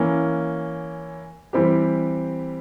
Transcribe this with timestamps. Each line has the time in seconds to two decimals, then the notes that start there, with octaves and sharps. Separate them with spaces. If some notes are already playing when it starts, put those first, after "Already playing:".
Already playing: E3 A#3 C#4
1.53 E3 G3 C4 G4